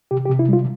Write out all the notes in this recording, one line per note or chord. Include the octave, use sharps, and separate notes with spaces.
C3 G4
G4
C3
E4
G3 F4